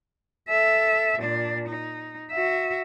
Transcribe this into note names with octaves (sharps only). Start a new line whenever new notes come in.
A4 E5
A#2 D4
D#4
F#4 E5